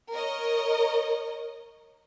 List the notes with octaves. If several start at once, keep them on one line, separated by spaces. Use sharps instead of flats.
A#4 C#5 D#5